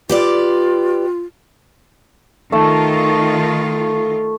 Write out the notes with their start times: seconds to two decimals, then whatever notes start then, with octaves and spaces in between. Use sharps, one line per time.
0.09 F4 G4 B4 D5
2.52 D#3 A3 F4 A5